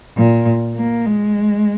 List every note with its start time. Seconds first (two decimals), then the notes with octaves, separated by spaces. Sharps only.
0.17 A#2
0.76 A#3
1.06 G#3